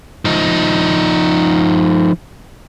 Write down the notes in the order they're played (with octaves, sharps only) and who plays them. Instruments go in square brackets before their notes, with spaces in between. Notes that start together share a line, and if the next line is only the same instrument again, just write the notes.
[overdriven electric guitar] F3 D#4